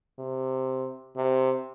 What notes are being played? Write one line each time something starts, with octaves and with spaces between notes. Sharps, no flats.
C3
C3